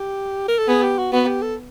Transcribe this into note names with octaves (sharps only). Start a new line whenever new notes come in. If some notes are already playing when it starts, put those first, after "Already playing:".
Already playing: G4
A#4
A4
B3 G#4
G4
F#4
B3 F#4
G4
A4